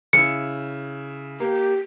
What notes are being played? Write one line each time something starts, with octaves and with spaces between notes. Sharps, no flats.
C#3 E4 C#7
A#3 G4